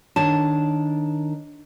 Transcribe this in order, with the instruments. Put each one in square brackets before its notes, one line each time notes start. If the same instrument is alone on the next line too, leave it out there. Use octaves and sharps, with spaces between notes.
[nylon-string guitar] D#3 D4 C#5 A5